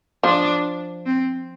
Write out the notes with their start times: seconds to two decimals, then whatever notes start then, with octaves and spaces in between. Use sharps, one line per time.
0.24 F3 D4
1.06 C4